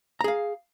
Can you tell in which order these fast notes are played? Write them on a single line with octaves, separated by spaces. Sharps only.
A#5 G#4 F5